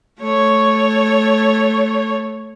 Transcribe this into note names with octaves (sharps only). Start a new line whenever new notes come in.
A3 C#5